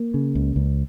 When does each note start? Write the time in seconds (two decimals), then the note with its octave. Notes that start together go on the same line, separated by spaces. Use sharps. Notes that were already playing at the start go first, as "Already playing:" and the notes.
Already playing: A#3
0.14 C#3
0.35 C#2
0.56 C#2